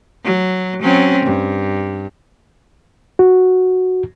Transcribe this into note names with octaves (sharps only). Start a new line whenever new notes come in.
F#3
F#3 C4 C#4
G2
F#4